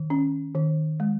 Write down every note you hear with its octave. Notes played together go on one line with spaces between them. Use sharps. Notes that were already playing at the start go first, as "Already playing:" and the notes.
Already playing: D#3
C#4
D#3
G#3